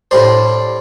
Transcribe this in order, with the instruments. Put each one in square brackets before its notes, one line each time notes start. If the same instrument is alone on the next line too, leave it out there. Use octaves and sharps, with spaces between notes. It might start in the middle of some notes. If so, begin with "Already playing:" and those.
[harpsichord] A2 G3 D4 C5